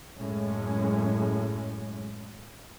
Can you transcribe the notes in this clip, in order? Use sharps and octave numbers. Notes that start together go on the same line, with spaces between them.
F#2 A2 G#3 C#4